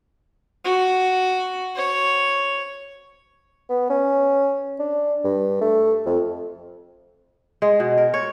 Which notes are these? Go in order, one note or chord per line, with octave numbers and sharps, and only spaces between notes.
F#4
C#5
B3
C#4
D4
G2
A3
F2
G#3
B2
A#4
C#5